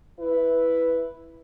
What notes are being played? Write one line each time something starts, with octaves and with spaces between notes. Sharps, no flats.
E4 B4